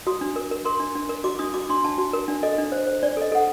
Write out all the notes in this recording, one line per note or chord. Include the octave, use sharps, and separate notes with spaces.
F#4 D#6
D4
A#4
A#4
A#4 C6
D4
D4
A#4
F#4 D6
D4 D#6
F#4 D6
D4 C6
D4 A5
F#4
A#4
D4
A4 D#5
D4
C5
C5
D4 D5
A4 D#5
A4 F#5